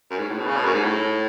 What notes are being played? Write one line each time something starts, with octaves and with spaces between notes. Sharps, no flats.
F#2
G#2
A2
B2
C#3
B2
F#2
G#2
A2